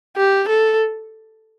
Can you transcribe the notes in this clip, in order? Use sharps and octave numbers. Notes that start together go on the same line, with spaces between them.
G4
A4